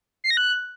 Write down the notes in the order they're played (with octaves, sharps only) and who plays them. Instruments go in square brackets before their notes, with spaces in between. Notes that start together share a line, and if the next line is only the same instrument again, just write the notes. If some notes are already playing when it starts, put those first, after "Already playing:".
[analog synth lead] C7
A#6
F#6